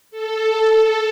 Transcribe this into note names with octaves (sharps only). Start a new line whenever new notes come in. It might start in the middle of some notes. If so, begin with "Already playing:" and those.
A4